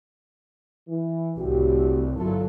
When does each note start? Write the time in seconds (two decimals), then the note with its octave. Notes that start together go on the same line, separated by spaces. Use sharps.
0.88 E3
1.37 C2 A2 F#4 G4
2.17 G1 F#3 E4 F4 A4